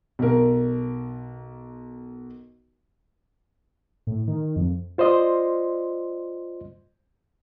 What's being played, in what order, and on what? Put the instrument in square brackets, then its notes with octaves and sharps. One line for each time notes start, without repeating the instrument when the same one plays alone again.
[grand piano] B1 A#4
[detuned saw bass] A2
D#3
F2
[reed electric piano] F4 C5 D5 D#5 C6